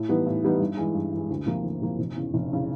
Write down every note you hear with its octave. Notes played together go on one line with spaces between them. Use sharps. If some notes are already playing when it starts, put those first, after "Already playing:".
Already playing: A2
E3 G3 B3 D#4
A2
E3 G3 B3 D#4
G2
E3 G#3
G2
E3
G#3
D2
C3 F3 A#3
D2
C3 F3 A#3
F1
E2 C#3
F1
C#3